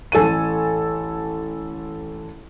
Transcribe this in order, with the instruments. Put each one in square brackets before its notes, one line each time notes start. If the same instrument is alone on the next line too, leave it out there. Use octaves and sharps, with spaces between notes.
[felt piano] A1 A4 G#5 D#7